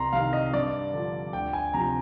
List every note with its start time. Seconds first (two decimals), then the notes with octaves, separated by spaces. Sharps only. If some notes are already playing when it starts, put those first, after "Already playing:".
Already playing: C2 A#5 C6
0.13 C3 D#3 F5
0.33 D#5
0.53 G2 D5
0.93 D3 F3
1.33 D2 G5
1.53 G#5
1.74 C3 F3 A#5